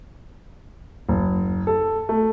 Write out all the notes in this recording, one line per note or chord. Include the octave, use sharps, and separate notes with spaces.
F#1
A4
A3